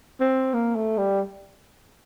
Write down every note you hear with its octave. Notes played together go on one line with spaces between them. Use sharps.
C4
A#3
A3
G3